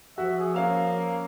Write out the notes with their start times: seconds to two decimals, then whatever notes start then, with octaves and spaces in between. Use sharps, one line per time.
0.18 F3 F#4 E5 F#5
0.40 G#4
0.54 A#3 C#4 F5 E6